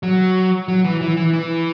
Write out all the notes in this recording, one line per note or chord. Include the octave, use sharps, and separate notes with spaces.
F#3
F#3
E3
E3
E3
E3